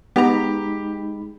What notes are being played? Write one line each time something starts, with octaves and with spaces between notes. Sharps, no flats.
G#3 B3 D#4 G4 A#5 B5